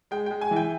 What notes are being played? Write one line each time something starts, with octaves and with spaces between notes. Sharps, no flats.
G#3 G5
G#3 G5
G#5
E3
G5